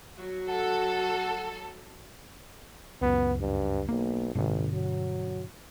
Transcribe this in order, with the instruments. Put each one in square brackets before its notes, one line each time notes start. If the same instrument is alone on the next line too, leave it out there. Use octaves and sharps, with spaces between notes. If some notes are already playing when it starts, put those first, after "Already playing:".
[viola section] F#3 F#4
[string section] A4 [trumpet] F#5
[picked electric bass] C#2 F#2 [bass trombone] B3
[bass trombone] G2
[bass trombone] B1 [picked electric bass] A#3
[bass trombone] A1 [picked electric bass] G2 B2 D3
[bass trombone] F#3